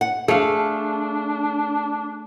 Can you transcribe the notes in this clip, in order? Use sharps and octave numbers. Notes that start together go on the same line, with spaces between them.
F#5
A3 D4 G#4 F5